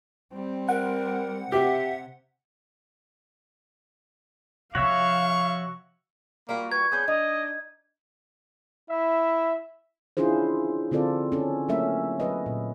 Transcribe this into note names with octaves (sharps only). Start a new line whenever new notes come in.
G3 C4
A#4 F#5
C3 G4 E5
C3 F3 F#4 C#5 E5 F5 C#6
G3 A#3 F4 F#4
B4 C#6 G#6
B3 C#4 D4 G#4 G6
D4 D#4 D#5
E4 E5
C#4 D4 E4 F4 G#4 C5
D3 C4 F4 A4 D5
C#4 A4
F#3 A3 A#3 C#4 A#4 E5
F#3 B4 D#5
A#2